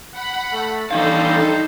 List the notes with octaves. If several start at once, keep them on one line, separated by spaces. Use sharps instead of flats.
F#5 B5
A3
D#3 E3 G3 D4 D#4 A4 C5 F5